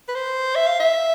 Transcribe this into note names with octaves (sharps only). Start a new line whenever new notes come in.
B4
C5
E5
F5
E5